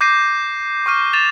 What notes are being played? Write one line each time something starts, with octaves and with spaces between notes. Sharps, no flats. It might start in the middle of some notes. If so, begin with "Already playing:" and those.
D6 G6 A#6 C7 D#7
C#6 D6 F6 D#7
A6 E7 F7